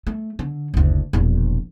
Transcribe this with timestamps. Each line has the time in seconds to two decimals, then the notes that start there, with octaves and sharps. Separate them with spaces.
0.07 A3
0.39 D3
0.74 F#1 D2
1.13 E1 A#1